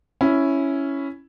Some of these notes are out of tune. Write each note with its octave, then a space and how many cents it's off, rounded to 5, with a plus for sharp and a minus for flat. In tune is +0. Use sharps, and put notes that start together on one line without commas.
C#4 +0 E4 +0